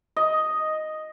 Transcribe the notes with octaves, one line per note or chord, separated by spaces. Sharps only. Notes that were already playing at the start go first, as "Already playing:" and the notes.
D#5